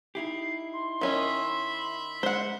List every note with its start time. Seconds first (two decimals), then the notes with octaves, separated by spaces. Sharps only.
0.15 D#4 E4 G4 C7
0.73 C6
1.01 D#3 C#4 D#5 E5 B5
2.23 G#3 C5 F#5